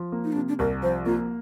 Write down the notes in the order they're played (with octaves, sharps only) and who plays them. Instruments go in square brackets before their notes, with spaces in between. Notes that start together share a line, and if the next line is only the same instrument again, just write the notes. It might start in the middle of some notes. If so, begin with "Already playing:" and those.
Already playing: [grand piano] F3
A#3
[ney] D#4
[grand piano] C3 [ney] D4
[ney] D4
[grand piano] C2 [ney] A#4
[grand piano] F3 [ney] C5
[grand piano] A#3 [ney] F4